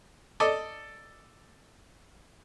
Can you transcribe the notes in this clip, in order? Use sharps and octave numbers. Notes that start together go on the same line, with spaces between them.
A4 D5 D#5